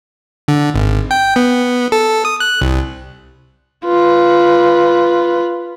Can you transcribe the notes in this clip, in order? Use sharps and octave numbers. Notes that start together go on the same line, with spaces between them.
D3
G#1
G5
B3
A4
D#6
F#6
C2
F4 B4